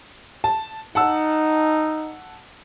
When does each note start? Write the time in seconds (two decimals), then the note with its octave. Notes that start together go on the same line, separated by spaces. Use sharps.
0.44 A5
0.95 D#4 F#5 A5 E6